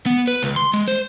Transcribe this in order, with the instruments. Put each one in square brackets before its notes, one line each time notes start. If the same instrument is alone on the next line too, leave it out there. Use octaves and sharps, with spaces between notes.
[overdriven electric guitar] B3
B4
C#2
C6
G#3
C5